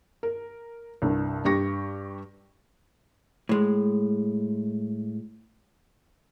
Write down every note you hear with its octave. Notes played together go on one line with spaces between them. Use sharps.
A#4
C2 G2
G2 G4 C#6 A#6
A2 G#3